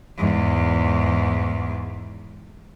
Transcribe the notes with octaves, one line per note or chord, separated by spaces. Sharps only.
E2 G#2